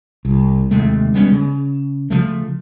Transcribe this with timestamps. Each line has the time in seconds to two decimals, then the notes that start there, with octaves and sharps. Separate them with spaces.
0.25 C2
0.71 D#2 C3 G#3 A3
1.14 G3 G#3 B3 C#4
1.32 C#3
2.10 C#3 F3 A3